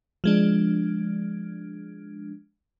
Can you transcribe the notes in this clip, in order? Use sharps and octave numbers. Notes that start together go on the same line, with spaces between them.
F3 G#3 D4